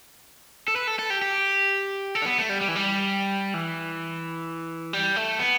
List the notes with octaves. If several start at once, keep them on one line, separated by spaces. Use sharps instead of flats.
A4
B4
A4
A4
G4
G4
A4
D4
B3
A3
G3
G3
E3
G3
E3
G3
A3
B3